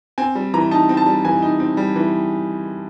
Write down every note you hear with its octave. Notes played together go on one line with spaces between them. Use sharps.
C4 G#5
G3
E3 A#5
D#4 A5
C4
A5
G3
E3 G#5
D#4
C4
G3
E3